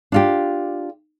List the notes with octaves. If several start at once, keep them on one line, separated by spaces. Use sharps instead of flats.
D4 F4 G4